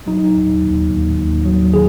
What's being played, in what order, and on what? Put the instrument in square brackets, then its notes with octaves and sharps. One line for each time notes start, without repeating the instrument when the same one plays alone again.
[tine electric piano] F#3 D#4
D#2
D#2
D#2
D#2
F#3
D#3 G#4